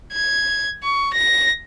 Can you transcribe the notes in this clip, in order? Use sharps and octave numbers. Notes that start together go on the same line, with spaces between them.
G#6
C#6
A#6